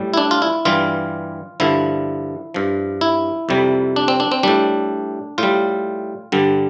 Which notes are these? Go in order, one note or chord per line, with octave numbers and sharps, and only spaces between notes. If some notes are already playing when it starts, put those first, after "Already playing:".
Already playing: A2 G3
E4
D4
F4
E4
G2 E3 G3 F4
G2 D3 F3 E4
G2 F3
E4
F2 C3 G3
D4
C4
D4
C4
A2 G3 D4
A2 G3 F4
G2 D3 G3